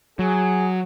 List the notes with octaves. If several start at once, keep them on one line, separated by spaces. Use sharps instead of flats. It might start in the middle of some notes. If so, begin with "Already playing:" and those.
F#3 G#4